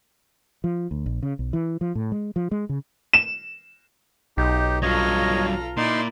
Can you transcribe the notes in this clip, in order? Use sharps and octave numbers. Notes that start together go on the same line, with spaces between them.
F3
D2
A#1
C#3
B1
E3
F3
A2
G#3
F3
G#3
C#3
E7
B1 D#4 G4
G2 F#3 F4 A4 C#5 D#5 A#5
A#2 D#4 E4 D5 C6